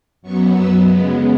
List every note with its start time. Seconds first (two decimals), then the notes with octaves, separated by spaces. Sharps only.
0.22 F#2 F#3 B3 C#6
0.53 E6
0.84 C#3 G#3 B3